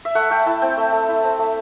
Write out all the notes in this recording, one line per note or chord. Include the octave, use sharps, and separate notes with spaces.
E5
A3 F#5
A3 G5
E4 A5
C4 G5
A3
A3
E4
C4
A3